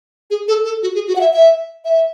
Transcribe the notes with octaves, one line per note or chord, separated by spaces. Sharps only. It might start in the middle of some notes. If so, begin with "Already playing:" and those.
G#4
A4
A4
F#4
G#4
F#4
F#5
E5
E5
E5